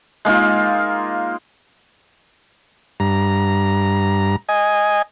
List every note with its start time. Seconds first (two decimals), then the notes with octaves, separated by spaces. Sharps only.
0.25 G#3 A#3 D#4 F4
3.00 G2 A#5
4.49 D#5 G#5